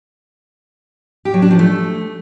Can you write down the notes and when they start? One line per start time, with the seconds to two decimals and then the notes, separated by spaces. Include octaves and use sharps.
1.25 G4
1.34 F#3
1.42 D4
1.51 F3
1.59 A3